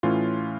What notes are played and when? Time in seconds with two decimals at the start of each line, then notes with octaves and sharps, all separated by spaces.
0.03 A2 E3 A3 C#4 F4